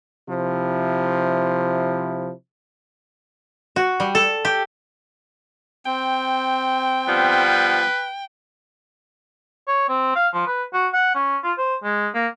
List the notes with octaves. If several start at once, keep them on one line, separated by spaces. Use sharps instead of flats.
C3 F3 E4
F#4
G3
A4
G4
C4 G5
F3 G3 B3 B4
C#5
C4
F5
F3
B4
F#4
F#5
C#4
F4
C5
G#3
A#3